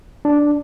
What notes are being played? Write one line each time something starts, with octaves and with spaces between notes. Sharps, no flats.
D4